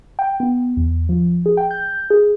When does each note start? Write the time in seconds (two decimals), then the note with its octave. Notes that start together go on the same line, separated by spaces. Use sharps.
0.19 G5
0.40 B3
0.77 E2
1.09 F3
1.46 G#4
1.57 G5
1.71 G6
2.10 G#4